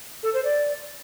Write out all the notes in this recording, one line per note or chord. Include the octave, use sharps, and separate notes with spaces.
A4
C5
D5